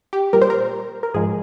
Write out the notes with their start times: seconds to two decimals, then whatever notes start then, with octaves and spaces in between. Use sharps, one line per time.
0.13 G4
0.33 A#2 G3 A#4
0.42 C5
0.50 A#4
1.03 A#4
1.14 G#2 F3 G#3 G#4